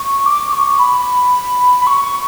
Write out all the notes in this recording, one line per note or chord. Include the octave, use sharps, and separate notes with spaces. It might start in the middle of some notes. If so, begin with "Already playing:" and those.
Already playing: C#6
D6
D6
C#6
B5
B5
C#6